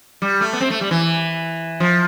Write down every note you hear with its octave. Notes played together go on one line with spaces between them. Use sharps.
G3
A3
B3
C4
A3
G3
E3
F3